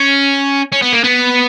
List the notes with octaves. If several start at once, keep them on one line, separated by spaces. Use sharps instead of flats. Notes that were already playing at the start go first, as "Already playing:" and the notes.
Already playing: C#4
C#4
B3
A#3
B3